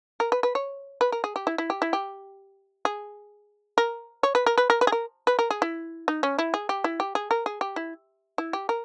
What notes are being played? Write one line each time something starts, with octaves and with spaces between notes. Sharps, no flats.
A#4
B4
B4
C#5
B4
A#4
G#4
G4
E4
E4
G4
E4
G4
G#4
A#4
C#5
B4
A#4
B4
A#4
B4
G#4
A#4
B4
A#4
G#4
E4
D#4
C#4
E4
G#4
G4
E4
G4
G#4
A#4
G#4
G4
E4
E4
G4
A#4